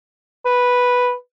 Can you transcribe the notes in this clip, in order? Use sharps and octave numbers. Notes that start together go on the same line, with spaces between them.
B4